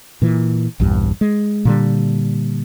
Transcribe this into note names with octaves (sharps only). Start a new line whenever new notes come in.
A#2 E3
A#1 E2 G2
G#3
A#2 D3 G3